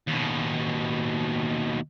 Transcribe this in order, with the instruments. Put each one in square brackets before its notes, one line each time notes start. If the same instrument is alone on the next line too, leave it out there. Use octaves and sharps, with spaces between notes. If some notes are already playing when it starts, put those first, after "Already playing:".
[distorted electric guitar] D#2 B2